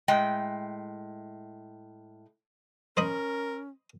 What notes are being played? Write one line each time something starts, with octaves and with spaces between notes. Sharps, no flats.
A2 G#3 G5
C#4 A#4 C5 D#5 B5